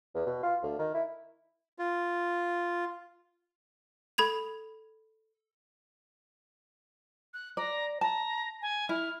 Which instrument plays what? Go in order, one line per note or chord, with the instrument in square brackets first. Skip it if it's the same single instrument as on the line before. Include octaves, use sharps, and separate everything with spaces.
[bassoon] E2
B2
F4
D2
D#3
E4
[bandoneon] F4
[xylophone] A4 B5 G#6 F7
[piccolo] F#6
[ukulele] D5 [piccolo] A#5
[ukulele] A5 [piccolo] A#5
[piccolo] G#5
[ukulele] E4 [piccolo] F6